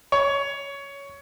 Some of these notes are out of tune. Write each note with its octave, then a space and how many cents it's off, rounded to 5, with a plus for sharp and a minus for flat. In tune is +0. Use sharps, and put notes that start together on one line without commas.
C#5 +15